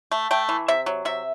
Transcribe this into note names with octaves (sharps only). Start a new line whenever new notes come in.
A3
A3 G5
E3
C3 E5
F#3
C3 E5